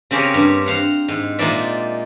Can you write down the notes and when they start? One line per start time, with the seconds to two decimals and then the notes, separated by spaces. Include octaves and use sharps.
0.11 C#3 C4 G4 G#4 A#4 C#5
0.34 G2
0.66 C5 F5 F#5
1.08 G#2
1.39 A#2 G#3 D#4 C5 D5 E5